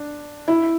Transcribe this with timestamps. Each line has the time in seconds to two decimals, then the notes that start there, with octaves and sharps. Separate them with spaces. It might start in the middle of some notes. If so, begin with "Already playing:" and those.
Already playing: D4
0.48 E4